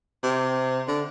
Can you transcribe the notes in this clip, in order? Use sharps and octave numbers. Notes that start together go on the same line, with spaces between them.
C3
D3